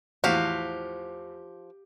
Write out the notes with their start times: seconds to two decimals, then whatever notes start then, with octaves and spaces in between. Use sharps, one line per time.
0.24 E2 A2 F3 F#4 G4 F5